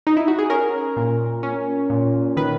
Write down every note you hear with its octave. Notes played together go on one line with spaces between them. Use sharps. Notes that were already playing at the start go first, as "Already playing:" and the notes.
D#4
E4
F#4
G#4
C#4 A#4
A#2
C#4
A#2
D#3 B4